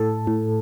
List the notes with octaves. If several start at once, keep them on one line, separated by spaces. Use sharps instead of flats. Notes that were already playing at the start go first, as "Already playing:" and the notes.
Already playing: A2 A4
A2